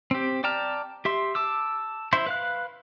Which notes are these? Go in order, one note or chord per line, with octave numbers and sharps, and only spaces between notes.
C4 G4
D5 G5 A5 A#5 F6
G4 E5 C6
A5 D6 E6
E4 C5 E5 C6
B4 F5 F#6